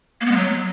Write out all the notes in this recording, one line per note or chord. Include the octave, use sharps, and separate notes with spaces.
A#3
B3
G#3
F#3